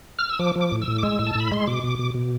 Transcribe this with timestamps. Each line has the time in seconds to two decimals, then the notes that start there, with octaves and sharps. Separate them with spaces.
0.19 F6
0.29 E6
0.39 F3 D6
0.55 F3
0.61 D6
0.72 A2
0.82 E6
0.88 A2
0.98 D6
1.03 G#3 E6
1.19 A2
1.27 A5
1.35 A2 B5
1.52 G#3 C6
1.67 B2 D6
1.83 B2
1.99 B2
2.14 B2